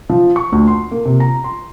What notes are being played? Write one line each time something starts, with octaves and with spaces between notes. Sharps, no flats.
F3
C#6
D2
C6
A#3
C3
A#5
C6